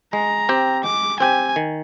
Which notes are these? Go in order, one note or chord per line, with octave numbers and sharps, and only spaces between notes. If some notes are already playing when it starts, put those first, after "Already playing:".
G#3 A#5
C4 G4
G#3 D6
C4 G4 G#5
D#3